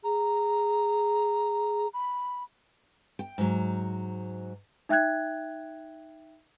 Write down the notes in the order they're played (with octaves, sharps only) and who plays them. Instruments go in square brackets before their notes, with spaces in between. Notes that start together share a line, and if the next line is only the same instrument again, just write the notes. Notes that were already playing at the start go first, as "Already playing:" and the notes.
[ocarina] G#4 [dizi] A#5
[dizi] B5
[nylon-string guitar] G5
G#2 F#3
[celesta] D#4 E5 G5 F#6 G#6